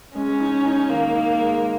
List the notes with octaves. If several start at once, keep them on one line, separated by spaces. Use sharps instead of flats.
G#3 C#4
D#4
D#4
D#3 A#3
D#4
G#3